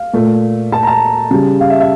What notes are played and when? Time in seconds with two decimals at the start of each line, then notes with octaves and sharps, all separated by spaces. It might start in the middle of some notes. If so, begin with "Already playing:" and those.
Already playing: F5
0.13 A#2 A3
0.72 A5
0.83 A#5
0.87 A5
1.31 C#3 G3
1.61 F5
1.70 E5
1.80 E5